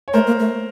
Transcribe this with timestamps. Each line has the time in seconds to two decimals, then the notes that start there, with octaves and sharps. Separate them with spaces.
0.08 C#5
0.14 A3 A#4 C5
0.27 A#3
0.39 A3